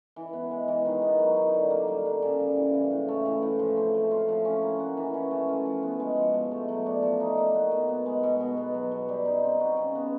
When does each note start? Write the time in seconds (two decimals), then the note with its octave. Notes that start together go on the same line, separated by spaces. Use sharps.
0.16 E3
0.33 B3
0.51 G#3
0.68 E3
0.86 D#3
1.02 B3
1.19 F#3
1.37 D#4
1.54 D3
1.70 A#3
1.88 G3
2.05 D3
2.22 C#3
2.40 G3
2.56 E3
2.74 C#3
2.91 A2
3.08 A3
3.26 E3
3.42 A2
3.59 F3
3.77 C4
3.94 A3
4.11 F4
4.29 F3
4.45 C#4
4.63 A#3
4.80 F#4
4.97 E3
5.14 C#4
5.31 A3
5.49 F4
5.65 F3
5.83 B3
6.00 G#3
6.17 F3
6.34 B2
6.51 A3
6.69 F#3
6.86 D4
7.03 F3
7.20 D#4
7.38 A#3
7.55 F#4
7.71 B2
7.89 B3
8.06 G#3
8.23 B2
8.40 B2
8.57 B3
8.74 F#3
8.92 B2
9.09 G3
9.25 D#4
9.43 C4
9.60 F#4
9.77 C#3
9.95 B3